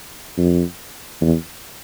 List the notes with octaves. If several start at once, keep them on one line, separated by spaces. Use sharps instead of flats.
F2
E2